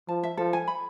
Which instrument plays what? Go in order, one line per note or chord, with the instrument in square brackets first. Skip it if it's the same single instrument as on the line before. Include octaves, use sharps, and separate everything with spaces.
[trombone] F3 [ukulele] A5
[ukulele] E5
[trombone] F3 [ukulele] A4
[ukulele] G#5
B5